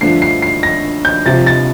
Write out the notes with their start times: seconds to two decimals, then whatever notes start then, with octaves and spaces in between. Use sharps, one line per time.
0.01 G2 D3 F3 A3 D4 C7
0.22 C7
0.42 C7
0.63 A#6
1.05 G6
1.26 C2 C3 F3 A6
1.46 A6